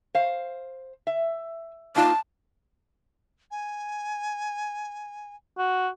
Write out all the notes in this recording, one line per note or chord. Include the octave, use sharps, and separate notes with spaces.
C5 F5
E5
A#3 D#4 F4 A5
G#5
F#4